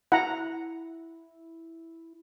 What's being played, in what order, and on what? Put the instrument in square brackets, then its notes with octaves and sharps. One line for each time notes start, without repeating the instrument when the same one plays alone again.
[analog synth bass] E4 [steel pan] F#5 A#5